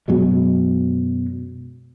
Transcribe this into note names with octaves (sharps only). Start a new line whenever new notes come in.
F#2 B2 F#3 G#3